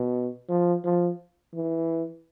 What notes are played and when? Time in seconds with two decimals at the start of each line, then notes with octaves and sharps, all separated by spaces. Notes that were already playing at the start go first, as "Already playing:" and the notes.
Already playing: B2
0.49 F3
0.84 F3
1.55 E3